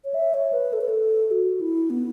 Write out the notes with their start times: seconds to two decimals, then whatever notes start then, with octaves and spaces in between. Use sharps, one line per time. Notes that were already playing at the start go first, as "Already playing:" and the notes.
0.04 C#5
0.14 E5
0.34 C#5
0.53 B4
0.73 A4
0.81 B4
0.89 A4
1.31 F#4
1.61 E4
1.90 B3